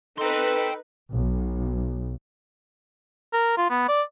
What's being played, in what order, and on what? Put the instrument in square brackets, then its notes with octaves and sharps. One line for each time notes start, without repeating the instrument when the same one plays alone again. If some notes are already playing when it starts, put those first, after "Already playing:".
[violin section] D#4 B4 [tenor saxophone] A4 [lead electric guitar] G5 C6
[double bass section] B1
[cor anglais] A#4
F4
B3
D5